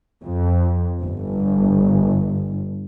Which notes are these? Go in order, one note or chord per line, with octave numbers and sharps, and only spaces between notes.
F2
G1